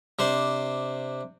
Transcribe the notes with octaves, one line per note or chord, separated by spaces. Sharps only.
C3 D4 C5